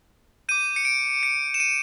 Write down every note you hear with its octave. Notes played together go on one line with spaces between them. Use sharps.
D6 G6 D#7
C#7
D7
C#7
E7
D#7